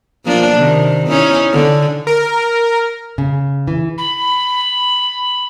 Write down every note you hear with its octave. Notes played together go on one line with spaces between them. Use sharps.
F3 A#3 D4
C3 D#3
C#4 D#4 E4
D3
A#4
C#3
E3
B5